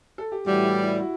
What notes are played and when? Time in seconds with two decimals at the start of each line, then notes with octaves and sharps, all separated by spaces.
0.18 A4
0.32 G4
0.46 A2 E3 G3 F#4
0.64 E4
0.83 E4
1.00 F#4